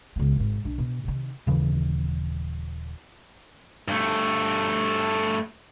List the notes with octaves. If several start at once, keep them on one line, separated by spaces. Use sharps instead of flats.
C#2 B3
G#1 G#2
B1 D4
B2
C3 D#3
D#1 C#3 E3
G2 A3